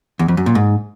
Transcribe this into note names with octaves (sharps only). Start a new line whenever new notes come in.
E2
F2
F#2
A#2
G#2